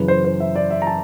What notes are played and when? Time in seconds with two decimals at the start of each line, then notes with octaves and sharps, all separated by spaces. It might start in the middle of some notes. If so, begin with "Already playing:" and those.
Already playing: F#2 C#3 E3 B4
0.08 C5
0.25 C5
0.40 E5
0.56 D5
0.70 E5
0.82 A#5
0.87 A5